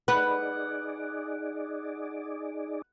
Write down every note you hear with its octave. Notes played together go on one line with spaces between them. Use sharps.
D#4 G#4 B4 D5 F#5